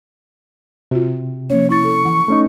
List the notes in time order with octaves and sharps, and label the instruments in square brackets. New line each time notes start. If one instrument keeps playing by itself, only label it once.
[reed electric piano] C3 [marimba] F4 F#4
[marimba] F3 A#3 C#4 [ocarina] C#5
[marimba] E4 A6 [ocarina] C#6
[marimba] A4
[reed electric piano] E3 [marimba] F#5
[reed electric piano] A3 C#4 D#4